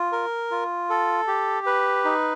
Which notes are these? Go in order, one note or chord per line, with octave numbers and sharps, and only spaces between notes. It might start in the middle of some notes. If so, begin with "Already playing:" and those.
Already playing: F4
A#4
F4
A4
G4
B4
D#4